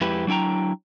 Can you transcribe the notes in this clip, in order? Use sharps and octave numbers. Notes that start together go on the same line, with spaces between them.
F2 G#3 E4 G4 B4
F#3 D4 E4 G5 A#5